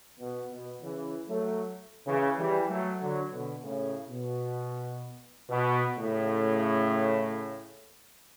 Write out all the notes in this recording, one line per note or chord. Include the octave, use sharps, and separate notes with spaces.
B2
B2
C#3 E3
F#3 A3
C#3 E3
E3 G3
F#3 A3
D3 F#3
B2 D3
A2 C#3
B2
B2
A2 C#3